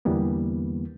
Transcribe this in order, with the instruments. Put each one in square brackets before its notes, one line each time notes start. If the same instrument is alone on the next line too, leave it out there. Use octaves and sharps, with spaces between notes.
[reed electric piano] E2 D3 E3 G3 A#3 B3